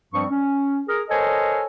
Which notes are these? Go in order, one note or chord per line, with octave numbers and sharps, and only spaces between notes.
G2 F3 G3 C4 C#6
C#4
G#4 A#4
A4 A#4 C5 C#5 D#5 G#5